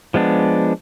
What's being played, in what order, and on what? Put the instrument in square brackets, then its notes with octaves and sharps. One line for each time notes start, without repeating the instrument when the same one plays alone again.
[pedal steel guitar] F3 G#3 B3 D4